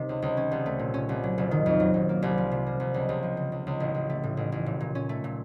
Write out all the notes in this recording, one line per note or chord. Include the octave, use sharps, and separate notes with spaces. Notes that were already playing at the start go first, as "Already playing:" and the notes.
Already playing: C3 D#3
C#2
C#2
C#4
C2
A3
A#2
C#4
C2
F#3
F#1
D#3
F2
F#3
F#1
A#3
C2
F3
C3
A#3
C2
C#2
C#2
F3
C#3
C#2
C#2
A1
A1
A3
A2
A1
A1
A#2
A#2
C#4
A3
A#2